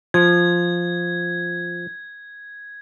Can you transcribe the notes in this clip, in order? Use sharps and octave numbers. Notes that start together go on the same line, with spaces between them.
F3 G#6